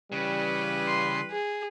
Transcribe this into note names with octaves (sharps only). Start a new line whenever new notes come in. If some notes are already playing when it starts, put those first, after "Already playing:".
C#3 E3 G3 B4
C6
G#4